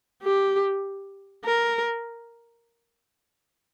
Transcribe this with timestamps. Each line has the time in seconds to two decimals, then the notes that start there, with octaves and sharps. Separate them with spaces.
0.23 G4
1.45 A#4